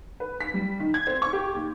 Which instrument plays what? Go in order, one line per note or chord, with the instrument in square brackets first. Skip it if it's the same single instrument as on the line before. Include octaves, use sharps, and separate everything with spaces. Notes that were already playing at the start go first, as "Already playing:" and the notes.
[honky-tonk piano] B4
B6
G3
D#3
G#6
C4
C#6
G4
D#2